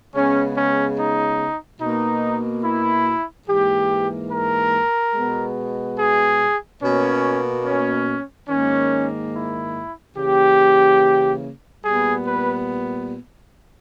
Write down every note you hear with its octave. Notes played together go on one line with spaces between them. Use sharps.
C#3 G#3 B3 C#4
C#4
D#4
B2 A#3 D#4
E4
G#2 E3 A#3 G4
A#4
B2 G#3 B3
G#4
B2 A#3 C#4
C#4
G#2 D#3 A#3 C#4
E4
C#3 E3 A#3 G4
A#2 G3 B3 G#4
B4